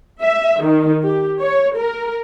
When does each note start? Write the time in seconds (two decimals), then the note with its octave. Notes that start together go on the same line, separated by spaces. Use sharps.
0.21 E5
0.63 D#3
1.04 G4
1.39 C#5
1.76 A#4